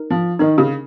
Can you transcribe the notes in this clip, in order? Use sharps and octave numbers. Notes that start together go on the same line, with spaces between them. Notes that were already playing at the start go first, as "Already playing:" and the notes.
Already playing: D#4 A#4
F3
D#3 D#4 A#4 D#5
C#3